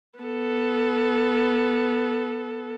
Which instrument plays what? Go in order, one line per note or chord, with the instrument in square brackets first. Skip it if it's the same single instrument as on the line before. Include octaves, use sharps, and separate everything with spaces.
[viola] B3 A4